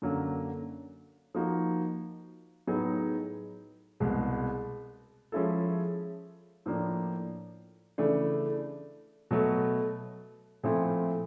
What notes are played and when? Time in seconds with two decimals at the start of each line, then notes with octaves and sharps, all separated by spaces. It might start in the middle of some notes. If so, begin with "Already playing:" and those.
0.02 F#2 D3 F#3 A#3
1.35 F3 A#3 D#4 F#4
2.67 A2 F#3 B3 D#4 G#4
4.00 C2 B2 G#3
5.32 F3 G#3 C#4 E4 A4
6.66 A2 F3 A#3 D4
7.98 C#3 E3 A3 D4
9.31 B2 F#3 A3
10.63 A#2 F3 A3 C4 E4